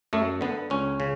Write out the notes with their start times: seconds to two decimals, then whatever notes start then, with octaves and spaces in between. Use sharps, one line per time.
0.13 F#2 A3
0.41 D3 B3
0.70 C#2 C#4
1.00 C#3